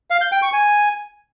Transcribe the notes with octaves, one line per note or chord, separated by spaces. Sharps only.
F5
G6
G5
C#6
G#5